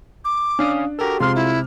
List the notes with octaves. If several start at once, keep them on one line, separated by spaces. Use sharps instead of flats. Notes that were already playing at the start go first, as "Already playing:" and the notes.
D6
C#4 D4 F5 D#6
F#4 G4 A4 A#4
C3 G#3 F4 C6 F6
E4